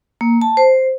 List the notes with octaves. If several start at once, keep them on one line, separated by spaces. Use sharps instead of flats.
A#3
A5
C5